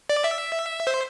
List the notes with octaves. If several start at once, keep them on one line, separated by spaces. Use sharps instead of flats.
D5
E5
C5